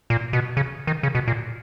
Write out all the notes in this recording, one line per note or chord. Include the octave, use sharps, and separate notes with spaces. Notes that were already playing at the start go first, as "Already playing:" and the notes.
A#2
B2
C#3
D#3
C#3
B2
A#2